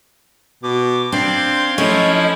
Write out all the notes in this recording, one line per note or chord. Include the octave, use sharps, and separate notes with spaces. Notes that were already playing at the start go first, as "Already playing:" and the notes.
B2 D6
C4 D4 F5 C6 G#6
F3 A3 C#4 D#4 E4 D#5